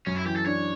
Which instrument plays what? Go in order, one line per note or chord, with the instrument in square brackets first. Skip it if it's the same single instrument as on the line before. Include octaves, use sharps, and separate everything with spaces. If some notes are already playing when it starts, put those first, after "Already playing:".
[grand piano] F#2 [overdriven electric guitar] C#4
[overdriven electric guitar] E4
[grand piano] E3 [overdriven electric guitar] G4
[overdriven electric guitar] A4
[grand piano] D4 [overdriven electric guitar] C#5